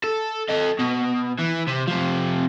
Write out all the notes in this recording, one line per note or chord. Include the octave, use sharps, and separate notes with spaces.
A4
A4 D#5
B2
E3
C3
C3 F3